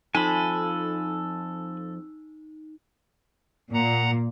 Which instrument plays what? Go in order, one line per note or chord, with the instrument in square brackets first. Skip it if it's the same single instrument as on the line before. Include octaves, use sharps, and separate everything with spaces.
[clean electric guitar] F2 F3 [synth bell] D#4 [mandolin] A4 [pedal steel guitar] G#5 B5
[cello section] A#2 [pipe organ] F#5 A#5